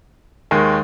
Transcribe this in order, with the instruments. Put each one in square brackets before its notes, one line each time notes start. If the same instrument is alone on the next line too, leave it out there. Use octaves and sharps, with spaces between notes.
[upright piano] D#2 D#3 G#3